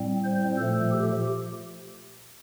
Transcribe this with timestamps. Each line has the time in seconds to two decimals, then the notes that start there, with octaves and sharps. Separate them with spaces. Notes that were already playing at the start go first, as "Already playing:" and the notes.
Already playing: A2 G3 C4
0.24 C5
0.57 A#2 F3 A3 A4
0.91 G4